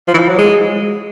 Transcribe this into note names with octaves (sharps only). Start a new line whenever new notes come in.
F3
E3
F3
F#3
G#3